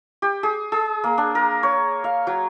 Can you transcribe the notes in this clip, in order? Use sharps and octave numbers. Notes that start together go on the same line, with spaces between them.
G4
G#4
G#4
A#3
D4
A#4
C#5
F5
F#3